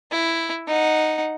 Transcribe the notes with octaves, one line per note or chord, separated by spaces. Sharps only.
E4
D#4 F#5